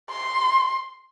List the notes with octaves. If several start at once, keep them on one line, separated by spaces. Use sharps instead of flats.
C6